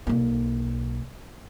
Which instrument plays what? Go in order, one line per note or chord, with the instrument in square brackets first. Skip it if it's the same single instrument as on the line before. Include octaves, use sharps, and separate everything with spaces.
[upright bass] B1 A#3